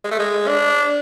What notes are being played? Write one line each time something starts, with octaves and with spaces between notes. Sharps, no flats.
G#3
A3
G#3
D4